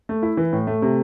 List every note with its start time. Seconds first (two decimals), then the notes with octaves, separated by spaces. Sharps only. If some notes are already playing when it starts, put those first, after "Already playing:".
0.09 A3
0.23 E4
0.37 E3
0.53 A2
0.67 A3
0.82 C3